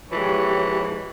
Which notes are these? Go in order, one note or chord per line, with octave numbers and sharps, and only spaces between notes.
E3 F3 G#3 G4 C#5